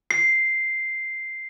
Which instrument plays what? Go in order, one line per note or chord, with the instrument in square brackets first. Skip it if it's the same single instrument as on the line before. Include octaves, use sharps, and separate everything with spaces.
[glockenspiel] C7